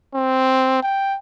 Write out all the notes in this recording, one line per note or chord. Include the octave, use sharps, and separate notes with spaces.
C4
G5